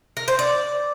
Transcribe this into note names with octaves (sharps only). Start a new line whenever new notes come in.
A#4
C5
D5